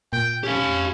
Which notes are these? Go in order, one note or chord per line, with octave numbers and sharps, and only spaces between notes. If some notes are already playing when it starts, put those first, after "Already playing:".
A#2 G5
C#4 G4 F5